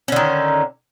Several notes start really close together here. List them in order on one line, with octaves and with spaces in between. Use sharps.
C#4 D3 D#3